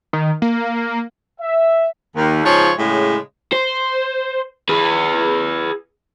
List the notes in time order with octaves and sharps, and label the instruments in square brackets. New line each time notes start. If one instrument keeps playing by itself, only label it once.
[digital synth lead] D#3
A#3
[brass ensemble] E5
[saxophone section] D#2
G#2 C#3 F3 C#5
A2 C#3 G#3
[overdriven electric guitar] C5
G#4 B4